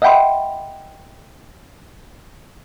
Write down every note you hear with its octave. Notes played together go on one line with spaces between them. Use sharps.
D#5 E5 F#5 G5 B5 C6